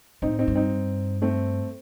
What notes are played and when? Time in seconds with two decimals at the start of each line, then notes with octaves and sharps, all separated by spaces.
0.22 A2 C4 D#4
0.39 C4 D#4
0.47 G2
0.55 C4 D#4
1.22 A3 C4